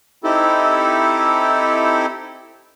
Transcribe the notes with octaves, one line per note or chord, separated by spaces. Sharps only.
C4 D#4 E4 G4 A4